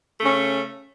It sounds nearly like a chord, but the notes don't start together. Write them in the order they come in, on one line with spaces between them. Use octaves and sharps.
A3 C#3 C#4